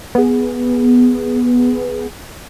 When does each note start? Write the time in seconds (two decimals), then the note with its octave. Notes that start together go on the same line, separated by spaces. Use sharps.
0.15 B3 G#4